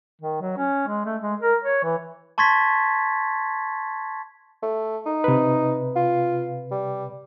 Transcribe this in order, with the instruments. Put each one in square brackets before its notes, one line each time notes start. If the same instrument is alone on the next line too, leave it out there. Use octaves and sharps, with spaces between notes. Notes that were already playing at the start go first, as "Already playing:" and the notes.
[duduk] D#3
F#3
C#4
G#3
A3
G#3
A#4
C#5
E3
[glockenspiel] A5 C6 C#6 G#6 A6 B6
[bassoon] A3
D#4
[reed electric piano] C3 B4
[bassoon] F4
G3